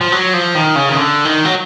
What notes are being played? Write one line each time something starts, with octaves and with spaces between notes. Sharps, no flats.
F3
F#3
F3
D#3
C#3
D#3
D3
D#3
F#3